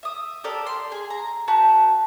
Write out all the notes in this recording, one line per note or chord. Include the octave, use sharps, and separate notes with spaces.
E5 D#6
G4 A4 A#4 D5
C6
G#4
A#5
F#4 B4 A5 G6